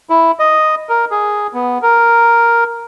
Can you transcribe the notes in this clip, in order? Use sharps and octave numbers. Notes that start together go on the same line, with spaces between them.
E4
D#5
A#4
G#4
B3
A#4